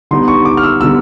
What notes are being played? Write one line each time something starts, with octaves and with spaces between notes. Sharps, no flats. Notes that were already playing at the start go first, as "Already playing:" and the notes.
D3 G3 B3 D#4 C6
C#6
D6
F6
E6
D3 G3 B3 D#4 E6